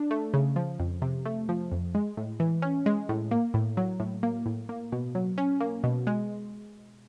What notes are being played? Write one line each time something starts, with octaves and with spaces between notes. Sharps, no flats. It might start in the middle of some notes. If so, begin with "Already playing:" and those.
Already playing: D4
A3
C#3
F3
F2
C3
A3
F3
F2
G#3
A2
E3
C#4
G#3
A2
A#3
A2
F#3
A2
A#3
A2
A#3
B2
F#3
C#4
A#3
B2
G#3